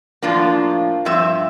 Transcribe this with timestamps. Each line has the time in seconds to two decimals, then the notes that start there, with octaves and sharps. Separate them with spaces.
0.22 A2 F3 A#3 D4 F4
1.05 G2 F3 C4 E5